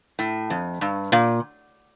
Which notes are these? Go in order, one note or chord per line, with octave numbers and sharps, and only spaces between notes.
A2
F2
G2
A#2